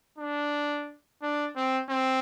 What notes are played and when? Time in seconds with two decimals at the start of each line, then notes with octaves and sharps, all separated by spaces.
0.18 D4
1.22 D4
1.56 C4
1.89 C4